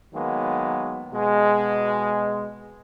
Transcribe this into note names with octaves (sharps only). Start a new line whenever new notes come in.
D#3 F#3 G#3 A#3 B3
B2 G#3